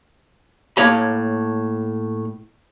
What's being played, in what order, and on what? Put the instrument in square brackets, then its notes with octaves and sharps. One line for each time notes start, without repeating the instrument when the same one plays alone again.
[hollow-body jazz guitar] A2 A#3 C#5 D#5 B5